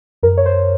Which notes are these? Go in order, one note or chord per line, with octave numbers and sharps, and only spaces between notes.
F#2 A#4
C#5
C5